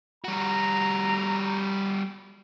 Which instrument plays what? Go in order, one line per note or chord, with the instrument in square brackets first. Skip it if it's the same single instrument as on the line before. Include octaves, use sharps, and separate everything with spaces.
[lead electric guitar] G3 F#4 [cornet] A#5